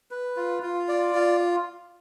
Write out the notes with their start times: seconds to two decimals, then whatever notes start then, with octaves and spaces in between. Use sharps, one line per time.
0.11 B4
0.36 F4
0.62 F4
0.88 D5
1.15 F4